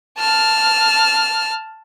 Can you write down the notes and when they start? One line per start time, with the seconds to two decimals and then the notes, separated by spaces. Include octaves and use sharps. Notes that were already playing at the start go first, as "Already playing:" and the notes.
0.19 A5 F6